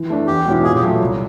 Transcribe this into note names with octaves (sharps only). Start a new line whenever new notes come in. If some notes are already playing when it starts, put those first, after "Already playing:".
Already playing: E3
A3 D4
E2 G4
B2 G#3 C#4 E4
A#2 G#4
G4
F#3 A3
C2